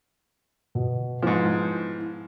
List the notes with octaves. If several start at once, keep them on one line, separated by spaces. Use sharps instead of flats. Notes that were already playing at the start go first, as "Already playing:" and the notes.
B2
G#2 F3 B3 E4